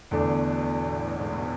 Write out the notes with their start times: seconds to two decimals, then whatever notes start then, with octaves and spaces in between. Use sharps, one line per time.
0.11 E2 B2 D3 A3 D4
0.79 A2
1.13 G#2